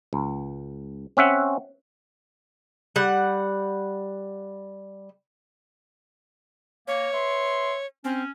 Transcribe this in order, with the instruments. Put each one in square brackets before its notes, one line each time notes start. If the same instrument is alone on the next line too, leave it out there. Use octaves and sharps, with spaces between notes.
[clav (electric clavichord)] C#2
C4 C#4 E5 F#5
[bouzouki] G3 F#5
[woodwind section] A#3 [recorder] C#5
[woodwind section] B4 E5 C6
[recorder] C4 [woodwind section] C#4